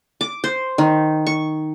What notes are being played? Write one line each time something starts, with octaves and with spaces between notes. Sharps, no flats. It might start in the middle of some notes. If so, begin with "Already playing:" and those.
D6
C5
D#3
C#6